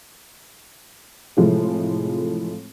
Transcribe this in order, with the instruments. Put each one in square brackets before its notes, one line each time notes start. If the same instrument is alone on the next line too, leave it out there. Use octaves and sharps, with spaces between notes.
[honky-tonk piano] A2 C3 E3 F3 G#3 A3